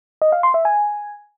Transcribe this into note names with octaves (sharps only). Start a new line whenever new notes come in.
D#5
F5
C6
E5
G#5